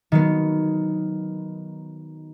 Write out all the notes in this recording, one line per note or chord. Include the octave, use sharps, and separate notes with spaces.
D#3 F#3 B3